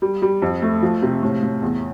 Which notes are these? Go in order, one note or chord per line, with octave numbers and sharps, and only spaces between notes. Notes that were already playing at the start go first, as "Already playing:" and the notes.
G3
G3
F2
A3
F3
C3
A2
A2
E2